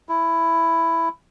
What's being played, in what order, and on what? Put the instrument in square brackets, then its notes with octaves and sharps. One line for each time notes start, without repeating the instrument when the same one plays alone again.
[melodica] E4